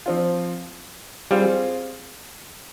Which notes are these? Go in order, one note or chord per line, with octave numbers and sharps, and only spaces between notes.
F3 C4 F4
G3 C4 F4 G#4